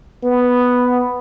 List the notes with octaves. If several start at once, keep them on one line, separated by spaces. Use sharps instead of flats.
B3